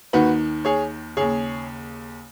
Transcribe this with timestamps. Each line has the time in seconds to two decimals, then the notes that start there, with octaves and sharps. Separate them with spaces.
0.13 D#2 D#3 F#4 B4
0.65 G#4 C#5
1.17 D#2 C#3 G#4 C#5